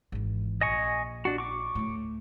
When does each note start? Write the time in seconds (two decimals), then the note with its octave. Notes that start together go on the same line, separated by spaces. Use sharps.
0.12 G#1 E3
0.61 A#1 D#5 G#5 C#6
1.25 D4 F#4
1.38 C#6 D6
1.75 D2 A2